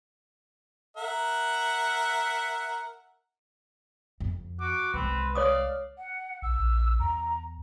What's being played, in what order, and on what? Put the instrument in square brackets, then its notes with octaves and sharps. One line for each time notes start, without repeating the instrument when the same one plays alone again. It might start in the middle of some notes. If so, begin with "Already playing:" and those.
[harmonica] A#4 E5 F#5
[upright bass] F2
[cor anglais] F#4 [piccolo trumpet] D6
[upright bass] C2 G#3 [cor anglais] C4 [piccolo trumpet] B4
[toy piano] C#5 D6 D#6 [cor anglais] D5 [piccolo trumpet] F5
[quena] F#5
[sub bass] B1 [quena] E6
[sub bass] A#1
[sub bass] E2 [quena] A#5